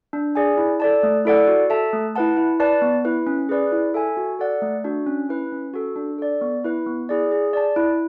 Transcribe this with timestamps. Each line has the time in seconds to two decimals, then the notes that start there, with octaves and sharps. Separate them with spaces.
0.13 D4
0.35 G#4 D5 G#5
0.57 E4
0.80 A4 D5 A5
1.03 A3
1.25 E4 A4 D5 F#5
1.48 F#4
1.70 A4 E5 A5
1.93 A3
2.16 E4 B4 F#5 A5
2.37 E4
2.60 B4 D5 A5
2.82 B3
3.05 E4 B4
3.27 C#4
3.49 G#4 B4 D5
3.72 E4
3.94 A4 E5 G#5
4.17 F#4
4.39 A4 D5 F#5
4.62 A3
4.84 D4 F#4
5.07 C#4
5.29 E4 B4
5.52 C#4
5.74 F#4 A4
5.96 D4
6.18 A4 D5
6.41 B3
6.64 E4 B4
6.86 B3
7.09 E4 G#4 D5
7.31 G#4
7.53 D5 A5
7.76 E4